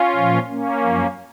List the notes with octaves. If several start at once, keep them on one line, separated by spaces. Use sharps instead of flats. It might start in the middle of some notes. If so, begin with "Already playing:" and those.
Already playing: C#4 F4
A#2 F3
A#3 C#4
F#2 F3